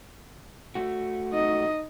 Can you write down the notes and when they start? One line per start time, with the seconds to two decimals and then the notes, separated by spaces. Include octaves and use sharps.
0.75 A3 F#4
1.33 D#4 D#5